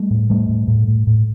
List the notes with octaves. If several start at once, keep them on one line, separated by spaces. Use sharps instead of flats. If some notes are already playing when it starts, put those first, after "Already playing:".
Already playing: G3 A3
A2
A2 G3 A3
A2
A2
A2
A2